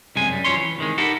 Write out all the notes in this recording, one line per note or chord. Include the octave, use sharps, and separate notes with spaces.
C2 F#2 C3 G#3 G#5
F#2 G3
F3 F#3 C#4 C#5 C6
E3
C3 D#3 G#3
D#4 E4 G4 A4 A#4 F#5